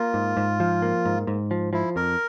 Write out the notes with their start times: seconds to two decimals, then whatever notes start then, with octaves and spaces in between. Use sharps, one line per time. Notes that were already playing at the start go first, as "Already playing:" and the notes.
Already playing: A#3 F4
0.14 G#2
0.37 G#2
0.60 F3
0.82 A#3
1.05 G#2
1.27 G#2
1.51 F3
1.73 F3 E4
1.96 F2 A#4